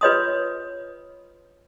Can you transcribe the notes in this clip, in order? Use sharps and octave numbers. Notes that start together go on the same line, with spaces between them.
F4 B4 C#5 D#5 C6 D#6